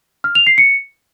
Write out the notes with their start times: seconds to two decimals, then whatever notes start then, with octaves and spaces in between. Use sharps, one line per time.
0.24 F6
0.35 F7
0.47 C7
0.58 C#7